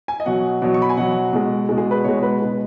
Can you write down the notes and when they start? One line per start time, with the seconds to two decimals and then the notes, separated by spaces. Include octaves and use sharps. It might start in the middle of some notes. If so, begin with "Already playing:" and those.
0.08 G#5
0.20 D#5
0.26 B2 F#3 F#5
0.62 B2 F#3
0.74 C#6
0.82 B5
0.89 G#5
0.97 B2 F#3 F#5
1.33 B2 G#3
1.69 B2 G#3
1.78 G#4
1.91 B4
2.04 B2 G#3 C#5
2.23 B4
2.41 B2 G#3